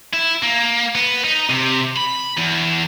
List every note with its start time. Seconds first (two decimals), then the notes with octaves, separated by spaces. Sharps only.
0.13 E4
0.43 A#3
0.95 B3
1.24 D#4
1.50 C3
1.97 B5
2.38 E2